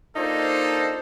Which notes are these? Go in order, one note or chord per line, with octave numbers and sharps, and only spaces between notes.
A#3 D4 D#4 F4 A4 C5